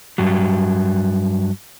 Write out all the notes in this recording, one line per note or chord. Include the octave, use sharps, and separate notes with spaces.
G2 F#3